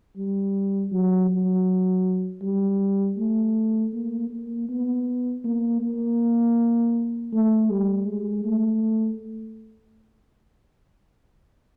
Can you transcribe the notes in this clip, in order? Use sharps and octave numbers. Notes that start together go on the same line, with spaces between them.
G3
F#3
F#3
G3
A3
A#3
A#3
B3
A#3
A#3
A3
G3
G#3
A3